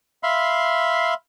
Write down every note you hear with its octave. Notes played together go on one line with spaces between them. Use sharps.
E5 F5 B5 C6